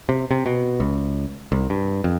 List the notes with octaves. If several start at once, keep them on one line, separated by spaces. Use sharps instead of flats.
C3
C3
B2
C#2
C2
G2
F2